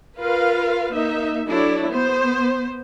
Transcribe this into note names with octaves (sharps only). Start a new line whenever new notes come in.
F4 A#4 B4 F5
A#3 D#4 E5
F#3 D4 E4 A4 C#5
B3 C5